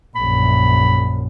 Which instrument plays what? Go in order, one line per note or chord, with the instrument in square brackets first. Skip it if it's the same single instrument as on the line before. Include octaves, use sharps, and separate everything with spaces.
[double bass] A#1 F#2 [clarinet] B5